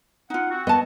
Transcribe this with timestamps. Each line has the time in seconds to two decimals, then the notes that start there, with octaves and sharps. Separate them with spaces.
0.30 D#4 F4 F#5
0.50 C4 F#4
0.67 B3 D#5 A5